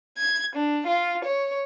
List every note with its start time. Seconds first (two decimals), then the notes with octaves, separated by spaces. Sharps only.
0.18 G#6
0.55 D4
0.87 F4
1.25 C#5